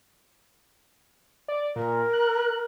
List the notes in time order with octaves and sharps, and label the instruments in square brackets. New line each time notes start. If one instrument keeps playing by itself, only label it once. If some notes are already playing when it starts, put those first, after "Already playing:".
[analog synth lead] D5
[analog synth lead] A#2 [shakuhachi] A#4
[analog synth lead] F#6